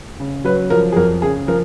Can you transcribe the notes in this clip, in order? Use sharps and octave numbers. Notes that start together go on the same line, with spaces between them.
C#3
F#3 B4
F3 A#4
G#4
F2 A#4
C#3 G#4
F3 A#4